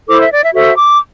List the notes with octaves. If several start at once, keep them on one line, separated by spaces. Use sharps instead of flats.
E4 A4 C5 D6
E5
D5
E5
F#4 A4 C5 E5
D6